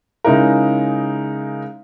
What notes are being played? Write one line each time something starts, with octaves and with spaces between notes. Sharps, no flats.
C#3 G#3 D#4 E4 A#4